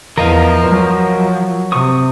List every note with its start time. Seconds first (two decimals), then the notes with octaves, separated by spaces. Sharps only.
0.18 E2 F3 A#4 D#5 F5
0.66 F#3
1.72 C3 C#6 D#6